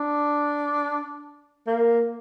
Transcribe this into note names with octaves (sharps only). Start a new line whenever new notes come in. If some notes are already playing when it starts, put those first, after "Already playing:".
Already playing: D4
A#3